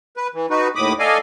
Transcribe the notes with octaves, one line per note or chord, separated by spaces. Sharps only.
B4
E3
D#4 F#4 B4
D#2 A2 B5 D6 D#6
A4 D5 D#5 F5 G#5